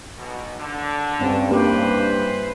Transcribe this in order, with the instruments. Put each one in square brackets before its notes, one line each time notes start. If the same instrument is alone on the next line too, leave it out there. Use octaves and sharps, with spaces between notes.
[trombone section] B1 B2
D3
[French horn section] G2 [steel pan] C4 C#4
[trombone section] E3 B4 C5 [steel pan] A#3 G4